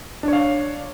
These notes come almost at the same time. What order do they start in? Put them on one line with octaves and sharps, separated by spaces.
D4 C#5 F5